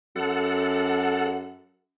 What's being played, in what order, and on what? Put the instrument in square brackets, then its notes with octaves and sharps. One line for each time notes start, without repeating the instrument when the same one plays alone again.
[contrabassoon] F#2 [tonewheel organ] A4 F#5